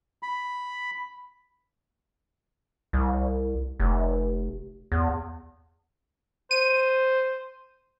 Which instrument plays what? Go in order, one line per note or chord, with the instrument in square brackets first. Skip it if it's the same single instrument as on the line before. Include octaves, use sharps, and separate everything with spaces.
[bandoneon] B5
[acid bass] C2
F1
E2
[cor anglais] C5 [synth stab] D#7